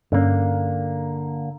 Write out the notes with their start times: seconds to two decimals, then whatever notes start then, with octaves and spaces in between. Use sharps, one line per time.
0.12 G2 D3 A#3 C#4